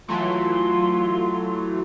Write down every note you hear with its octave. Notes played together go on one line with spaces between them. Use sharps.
E3 F#3 A3 F4 C6